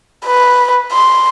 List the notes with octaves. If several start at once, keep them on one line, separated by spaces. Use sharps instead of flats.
B4
C6